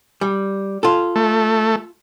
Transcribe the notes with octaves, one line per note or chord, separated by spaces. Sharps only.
G3
F4 A4
A3